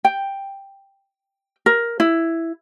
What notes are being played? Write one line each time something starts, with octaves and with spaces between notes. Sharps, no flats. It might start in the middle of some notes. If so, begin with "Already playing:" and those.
G5
A#4
E4